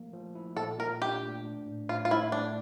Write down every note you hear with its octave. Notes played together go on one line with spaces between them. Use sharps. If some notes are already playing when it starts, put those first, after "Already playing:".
Already playing: F3 A3 A#3
F3
E4
A#2 A4
A#2 A#4
D4 G4
A3
D4
A2
A2 F4
F4
A2 E4
A3 D4